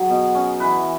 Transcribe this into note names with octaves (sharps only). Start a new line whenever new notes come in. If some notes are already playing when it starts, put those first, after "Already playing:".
Already playing: F#3 G#4
B2
C#4
E3 B4